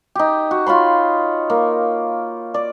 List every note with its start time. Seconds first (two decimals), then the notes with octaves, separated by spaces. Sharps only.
0.15 D#4 G4
0.51 F#4
0.66 F4 C#5 B5 C6
1.50 A#3
2.54 D5